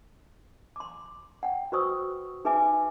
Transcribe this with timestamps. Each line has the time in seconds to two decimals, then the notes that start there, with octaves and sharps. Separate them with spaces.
0.76 C6 D6
1.43 F#5 G5
1.72 F#4 B4 C5 C#6 D#6 E6
2.45 D#4 G#4 B4 E5 G#5 D6